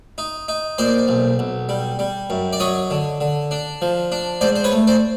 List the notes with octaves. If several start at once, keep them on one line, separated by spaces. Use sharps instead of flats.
D#4
D#4
A#2 C5 D5
B1
B1
G3
G3
F#2
D5
F#3 C#5 D#5
D3
D3
D4
F3
D4
G#2 C5 D5
C5
B4 C#5
A3
C5 D5